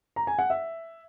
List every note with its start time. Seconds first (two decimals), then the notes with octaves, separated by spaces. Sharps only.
0.16 A#5
0.27 G#5
0.39 F#5
0.50 E5